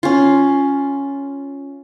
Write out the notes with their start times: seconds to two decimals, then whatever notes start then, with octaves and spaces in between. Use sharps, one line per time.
0.03 C#4 F4